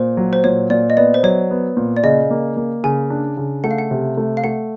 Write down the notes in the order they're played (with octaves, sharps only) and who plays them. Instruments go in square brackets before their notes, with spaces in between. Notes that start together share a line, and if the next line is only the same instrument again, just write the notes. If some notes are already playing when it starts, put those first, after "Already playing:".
Already playing: [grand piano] A#2 [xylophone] C5
[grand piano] F#3
[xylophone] C5
[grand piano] A#2 [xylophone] C#5
[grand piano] A#2 [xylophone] D5
[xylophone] D#5
[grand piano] B3 [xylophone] D5
[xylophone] C5
[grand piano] F#3 [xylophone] C#5
[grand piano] B3
A#2
[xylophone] D5
[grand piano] C#3 [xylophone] D#5
[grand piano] A#3
A#3
[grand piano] C#3 [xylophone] G#5
[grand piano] D4
C#3
[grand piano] A3 [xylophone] F#5
[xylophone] F5
F#5
[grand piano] C3
A3
[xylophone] F5
[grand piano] A3 [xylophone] F#5